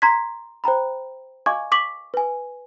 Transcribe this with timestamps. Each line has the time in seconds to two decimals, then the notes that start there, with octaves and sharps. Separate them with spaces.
0.02 A#5 C6 G#6 B6
0.64 C5 G5 A#5 B5
1.46 D#5 F5 G#5 C#6 D6 G#6
1.72 C#6 D6 B6 F#7
2.14 B4 G#5